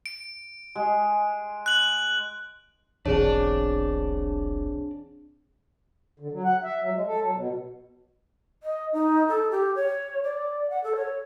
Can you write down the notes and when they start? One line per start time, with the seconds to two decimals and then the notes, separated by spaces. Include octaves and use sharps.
0.06 D7
0.75 G#3 G#4
1.66 F#6 F#7
3.06 E1 B1 E2 C4 D4 G#4 C#5 D5
6.20 D3
6.32 F#3
6.45 F#5
6.64 E5
6.81 F#3
6.95 G#3
7.07 A4
7.22 F#3
7.34 B2
8.63 D#5
8.93 D#4
9.28 A4
9.51 G4
9.76 C#5
10.23 D5
10.70 F#5
10.84 A4
10.96 C#5